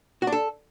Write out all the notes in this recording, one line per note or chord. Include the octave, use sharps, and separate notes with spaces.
F#4
D4
A4